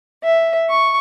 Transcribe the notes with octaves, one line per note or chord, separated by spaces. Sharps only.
E5
C#6